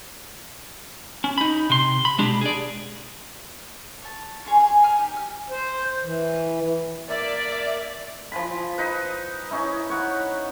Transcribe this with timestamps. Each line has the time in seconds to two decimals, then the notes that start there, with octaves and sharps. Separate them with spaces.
1.24 C#4
1.38 D#4 B5
1.70 C3 C6
2.05 B5
2.18 B2 G#3 D4 G4
2.41 G#4 D5
4.02 C#5 A5
4.45 C#4 F4 G#4 C#5
4.60 G#4
4.84 C#5 G#5 A#5 F6
4.98 D#4 G4
5.16 F6
5.50 C5
6.04 E3
7.09 A#3 D5 E5
8.32 F3 G#5 B5
8.78 D#4 B4
9.51 C#4 D#4 E4
9.90 C#5 F#5 B5